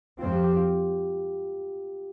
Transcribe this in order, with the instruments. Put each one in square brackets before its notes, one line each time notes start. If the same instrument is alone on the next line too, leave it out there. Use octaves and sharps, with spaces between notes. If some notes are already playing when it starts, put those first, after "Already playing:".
[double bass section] F2 F3 C4 [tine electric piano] F4
[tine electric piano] G4
G4
F4